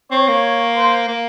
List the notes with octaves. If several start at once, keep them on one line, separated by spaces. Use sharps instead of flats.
C4 C#5
A#3
C5
A#3